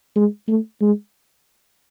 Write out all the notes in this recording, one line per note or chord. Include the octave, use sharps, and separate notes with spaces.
G#3
A3
G#3